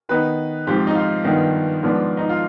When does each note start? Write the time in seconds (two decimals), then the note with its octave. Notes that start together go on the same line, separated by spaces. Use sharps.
0.09 D#3 B3 D#4 B4
0.67 G#2 F3 C4 G4
0.87 D#4
0.95 F4
1.24 G2 D#3 B3 D#4
1.83 G#2 F3 B3 D4
2.17 D#4
2.29 F4